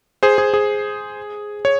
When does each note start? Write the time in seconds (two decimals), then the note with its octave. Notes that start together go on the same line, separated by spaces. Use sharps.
0.23 G#4 C5
0.38 G#4
0.54 G#4
1.65 C#5